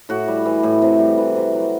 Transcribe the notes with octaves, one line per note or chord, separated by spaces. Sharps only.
A2 F#4
G3
E3
A2
C3
G3
E3
C3
F#3